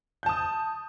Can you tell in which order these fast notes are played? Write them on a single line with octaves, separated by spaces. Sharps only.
G6 A5 D#6